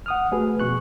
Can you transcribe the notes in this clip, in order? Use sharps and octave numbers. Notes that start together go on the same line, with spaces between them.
F#5 D#6 F6
A3 F#4 G#4 B4
F2 B2 C#6 F#6